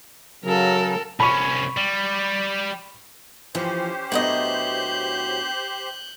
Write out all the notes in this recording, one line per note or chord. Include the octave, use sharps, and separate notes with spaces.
C#3 F#3 A4 A#4
C2 C#4 B5 C#6
G3
E3 F3 C#4 G4 C5
A2 F#3 B3 D4 D#5 F#6 G6